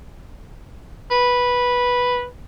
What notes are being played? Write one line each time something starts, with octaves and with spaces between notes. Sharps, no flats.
B4